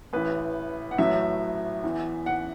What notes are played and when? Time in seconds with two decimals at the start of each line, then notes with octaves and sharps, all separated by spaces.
0.13 A1 A2 E3 B4
0.91 F#5
0.98 A1 A2 F#3 E5
1.84 E2 E3
2.26 F#5